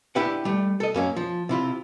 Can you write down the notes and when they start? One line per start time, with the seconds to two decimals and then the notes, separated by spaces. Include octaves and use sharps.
0.15 D4 E4 G4 B4 F#5
0.45 G3 A3
0.80 A4 D#5
0.94 F#2 A#3 C#4
1.16 F3
1.49 C3 E4 F4